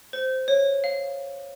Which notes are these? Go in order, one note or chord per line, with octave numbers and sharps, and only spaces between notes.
C5
C#5
F5